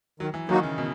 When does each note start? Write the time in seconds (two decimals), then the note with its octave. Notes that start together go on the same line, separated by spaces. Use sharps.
0.20 D#3 F#3
0.34 E3
0.49 D#3 F#3 A#3 D#4 F#4
0.63 C#3
0.78 B2 D#3